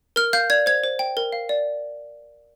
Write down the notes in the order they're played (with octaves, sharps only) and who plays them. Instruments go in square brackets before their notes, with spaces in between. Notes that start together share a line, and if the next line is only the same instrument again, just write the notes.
[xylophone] A#4 F6
F5 G6
D5 G#6
C5 G#6
C5
G5
A#4
F5
D5